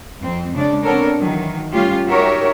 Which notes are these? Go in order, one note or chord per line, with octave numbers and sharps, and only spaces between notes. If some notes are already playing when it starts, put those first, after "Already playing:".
F2 C4
C#3 G#3 D4 D5
B3 C4 D4 A4 A#4 C#5
D#3 E3 F#3
G3 A3 C#4 F4 G4
D#4 F#4 G4 A#4 C#5 E5